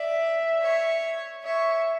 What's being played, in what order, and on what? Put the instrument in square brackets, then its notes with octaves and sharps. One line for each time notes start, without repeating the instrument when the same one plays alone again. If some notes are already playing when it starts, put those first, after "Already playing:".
Already playing: [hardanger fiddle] D5 [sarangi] E5
[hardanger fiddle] C#5
[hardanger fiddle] C#5 [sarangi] E5